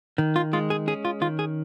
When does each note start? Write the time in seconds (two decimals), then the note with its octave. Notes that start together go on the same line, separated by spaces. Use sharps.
0.18 D#3
0.36 F4
0.53 G#3 F4
0.70 G#4
0.87 C#4 G#4
1.05 F4
1.21 D#3 F4
1.39 G#4